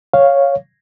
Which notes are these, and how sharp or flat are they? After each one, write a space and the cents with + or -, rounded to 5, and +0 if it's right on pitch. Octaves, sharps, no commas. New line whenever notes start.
C#5 +0 F5 +0